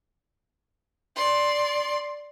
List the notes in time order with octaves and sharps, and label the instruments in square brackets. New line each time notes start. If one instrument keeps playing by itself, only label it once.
[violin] D5 C6